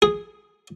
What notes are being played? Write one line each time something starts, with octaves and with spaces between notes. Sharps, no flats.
G#4